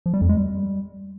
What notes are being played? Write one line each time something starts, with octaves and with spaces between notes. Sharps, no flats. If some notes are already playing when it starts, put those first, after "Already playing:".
F3
G3
F2
G#3
G3